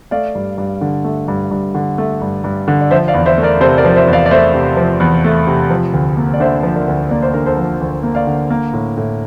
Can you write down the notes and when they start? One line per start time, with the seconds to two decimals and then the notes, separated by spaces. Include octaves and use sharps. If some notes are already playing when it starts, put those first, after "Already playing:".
0.11 A3 D5 F5
0.35 G2
0.58 G2
0.81 D3
1.04 A3
1.28 G2
1.51 G2
1.75 D3
1.98 A3
2.21 G2
2.44 G2
2.68 D3
2.81 D5
2.91 F3 C5 E5
3.08 D5 F5
3.14 E2
3.26 C5 E5
3.38 A3
3.43 A#4 D5
3.60 C3 A4 C5
3.78 A#4 D5
3.85 F3
3.96 C5 E5
4.07 E2
4.13 D5 F5
4.26 D5
4.31 A3 C5 E5
4.54 C3
4.77 F3
5.00 E2
5.24 A3
5.47 C3
5.70 F3
5.93 D2
6.17 A#3
6.34 D5
6.40 D3 C5 E5
6.63 F3
6.75 A#4 D5
6.88 D2
7.11 A#3 D5
7.22 C5
7.34 D3 A#4
7.46 A4 C5
7.57 F3
7.81 D2
8.03 A#3
8.15 D5 F5
8.27 D3
8.50 A#3
8.74 A2
8.97 A2